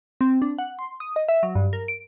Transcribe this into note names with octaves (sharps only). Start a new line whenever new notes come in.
C4
D4
F#5
C6
D#6
D#5
E5
F#3
G2
A#4
D7